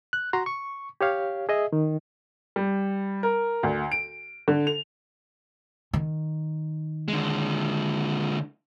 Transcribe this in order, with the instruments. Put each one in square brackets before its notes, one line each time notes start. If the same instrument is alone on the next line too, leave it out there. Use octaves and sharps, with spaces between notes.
[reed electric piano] F#6
F#4 A#5 C6
C#6
G4 C#5 F5
G#4 D#5 E5
D#3
[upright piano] G3
A#4
D2
D7
D3
F7
[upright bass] D#3
[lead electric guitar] D3 G#3